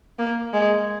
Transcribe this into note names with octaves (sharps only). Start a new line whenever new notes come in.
A#3
G#3